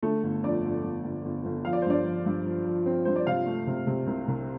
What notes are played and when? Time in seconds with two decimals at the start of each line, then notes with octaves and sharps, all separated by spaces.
0.03 D3 A3 A4
0.23 G1
0.43 F2 D4 D5
0.64 G1
0.83 G1
1.04 G1
1.25 G1
1.45 G1
1.64 F3 F5
1.73 D5
1.82 C5
1.85 G2 D4 D5
2.06 F3
2.26 G2
2.45 F3
2.65 F3
2.86 C4
3.05 G2 C5
3.16 D5
3.27 C3 F4 F5
3.46 A3
3.67 C3
3.87 C3
4.07 C2
4.28 C2